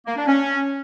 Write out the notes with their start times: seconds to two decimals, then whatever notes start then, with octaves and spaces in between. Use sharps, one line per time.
0.06 A#3
0.16 D4
0.27 C#4